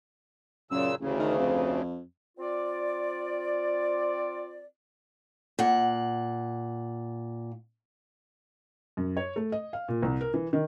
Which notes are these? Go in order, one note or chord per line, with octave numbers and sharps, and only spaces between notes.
F#2 A#2 C#3 E6
A1 D2 C#3
D#3
F2
C4 F4 D5
A#2 F#5
F#2
C#5
A3
D#5
F5
A#2
C2
A#4
E3
D#3